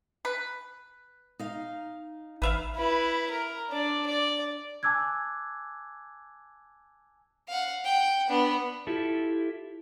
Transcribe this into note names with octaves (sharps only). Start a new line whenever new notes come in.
B4
D#4 F5
A1 B4 E5 F5
E4 B4
A#4
D4 D5
D5
G#5 A5 D6 E6 F#6 G#6
F5 F#5
F#5 G5
B3 D4
E4 F4 G4 A4